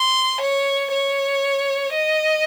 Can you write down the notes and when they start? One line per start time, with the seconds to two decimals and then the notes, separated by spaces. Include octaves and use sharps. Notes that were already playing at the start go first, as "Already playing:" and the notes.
Already playing: C6
0.41 C#5
0.92 C#5
1.94 D#5